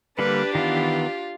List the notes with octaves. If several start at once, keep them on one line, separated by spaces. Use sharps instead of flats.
D3 G3 A#3 D4 G4 B4
D#3 E3 B3 F4